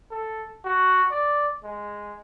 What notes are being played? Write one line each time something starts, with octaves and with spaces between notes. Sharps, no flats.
A4
F#4
D5
G#3